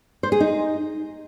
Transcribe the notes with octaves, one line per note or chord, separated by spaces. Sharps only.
C5
G#4
D#4